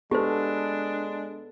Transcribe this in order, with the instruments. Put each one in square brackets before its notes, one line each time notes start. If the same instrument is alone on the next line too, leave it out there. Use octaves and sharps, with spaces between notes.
[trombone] G#3 [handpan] B3 A4 [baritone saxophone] D4 [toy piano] G4 C5